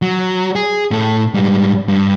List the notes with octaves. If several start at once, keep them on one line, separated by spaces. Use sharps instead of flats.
F#3
G#4
A2 A4
G#2 G3
G2